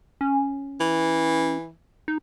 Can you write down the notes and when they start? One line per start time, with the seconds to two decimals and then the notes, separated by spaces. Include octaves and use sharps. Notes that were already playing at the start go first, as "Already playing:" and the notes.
0.21 C#4
0.81 E3
2.08 D#4